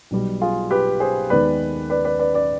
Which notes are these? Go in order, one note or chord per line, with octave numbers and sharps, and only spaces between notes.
B1 B2 G3
F4 G#4
G4 B4
G#4 C5
D#2 D#3 G#3 B3 B4 D5
B4 D5
B4 D5
B4 D5
B4 D5